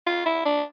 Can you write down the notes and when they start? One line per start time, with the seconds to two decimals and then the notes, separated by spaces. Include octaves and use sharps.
0.06 F4
0.26 E4
0.45 D4